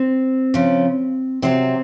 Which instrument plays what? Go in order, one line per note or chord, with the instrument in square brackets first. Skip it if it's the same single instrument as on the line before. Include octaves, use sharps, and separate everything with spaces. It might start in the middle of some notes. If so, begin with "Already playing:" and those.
Already playing: [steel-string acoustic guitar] C4
C#3 F3
C3 F#3 C4